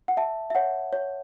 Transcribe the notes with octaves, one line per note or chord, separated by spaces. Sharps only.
F#5
E5 A5
E5
C#5 F#5
C#5